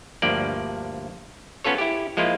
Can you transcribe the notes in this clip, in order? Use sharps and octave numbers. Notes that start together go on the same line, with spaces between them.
D2 G2 F3 A#3 D5
B3 C#4 F4 A4 C#5
E4 G4
F3 G#3 A#3 E4 F4